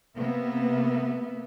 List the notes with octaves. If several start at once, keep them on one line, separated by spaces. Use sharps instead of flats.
C3 A#3 B3 E5